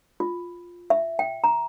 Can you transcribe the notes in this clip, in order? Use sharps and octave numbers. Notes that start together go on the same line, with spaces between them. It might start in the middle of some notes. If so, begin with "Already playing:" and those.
F4
E5
G5
A#5